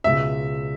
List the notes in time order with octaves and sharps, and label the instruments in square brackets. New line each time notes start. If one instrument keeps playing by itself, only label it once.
[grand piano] C#2 B2 G#3 C#4 [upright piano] E5